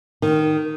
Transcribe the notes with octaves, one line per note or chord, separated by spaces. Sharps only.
D#3